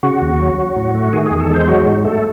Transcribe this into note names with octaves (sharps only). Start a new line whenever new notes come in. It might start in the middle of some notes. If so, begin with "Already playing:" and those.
C#3 F#4
D#2
F#3
F#3
A2
A3
D#3 G#4
E2 G#4
A4
G#3 C5
F#3 F#4
G#2
A3 A4